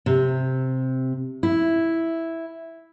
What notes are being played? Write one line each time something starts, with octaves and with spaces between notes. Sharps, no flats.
C3
E4